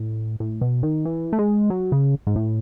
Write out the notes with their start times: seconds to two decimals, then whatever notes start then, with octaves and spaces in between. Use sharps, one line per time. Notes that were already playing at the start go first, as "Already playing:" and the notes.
Already playing: A2
0.40 A2
0.61 B2
0.83 D#3
1.05 E3
1.33 A3
1.38 G#3
1.70 F#3
1.92 C#3
2.27 G#2
2.36 A2